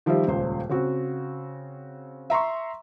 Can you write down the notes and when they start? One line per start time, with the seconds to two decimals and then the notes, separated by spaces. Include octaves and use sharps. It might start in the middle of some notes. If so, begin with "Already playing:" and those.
0.06 D#3 F3 G3 G4 C5 E5
0.27 D#1 C#2 C5
0.69 C#3 C4 F#4
2.30 E5 A#5 C6 C#6